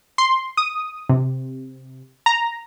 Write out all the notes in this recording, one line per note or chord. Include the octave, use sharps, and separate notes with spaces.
C6
D#6
C3
A#5